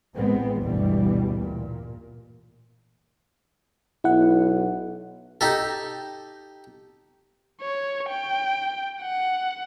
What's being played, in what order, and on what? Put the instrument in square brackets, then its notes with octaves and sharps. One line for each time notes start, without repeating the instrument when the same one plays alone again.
[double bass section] A1 G#3 B3 C4
G1 D2 B2 E3 G3
A#2
[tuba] B1 [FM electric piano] E4 F#5
[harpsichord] D#4 G4 A4
[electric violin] C#5
G5
F#5